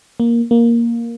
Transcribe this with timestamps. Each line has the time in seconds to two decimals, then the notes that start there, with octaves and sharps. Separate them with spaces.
0.20 A#3
0.51 A#3